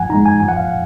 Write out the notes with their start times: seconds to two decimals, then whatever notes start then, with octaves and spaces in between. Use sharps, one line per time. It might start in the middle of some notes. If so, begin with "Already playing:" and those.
Already playing: F3 F#5 G#5
0.10 G#3 D#4 A#5
0.26 G#5
0.40 F3 G#5
0.48 F#5
0.57 F5
0.65 F#5